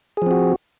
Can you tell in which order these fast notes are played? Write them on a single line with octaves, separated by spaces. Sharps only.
G#4 F3 C4 F#4